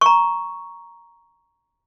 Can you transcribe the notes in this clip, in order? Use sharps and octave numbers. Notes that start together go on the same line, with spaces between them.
A#5 C#6